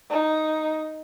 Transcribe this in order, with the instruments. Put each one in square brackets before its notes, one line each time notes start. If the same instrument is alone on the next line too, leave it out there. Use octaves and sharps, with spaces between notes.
[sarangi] D#4